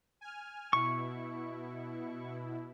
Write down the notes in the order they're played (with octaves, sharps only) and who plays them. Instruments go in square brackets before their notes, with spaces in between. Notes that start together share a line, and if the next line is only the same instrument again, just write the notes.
[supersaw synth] G#5 F6
[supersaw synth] B2 E4 [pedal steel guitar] C#6